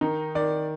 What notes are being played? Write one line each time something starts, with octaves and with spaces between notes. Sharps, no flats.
D#3 D#4
D#3 D5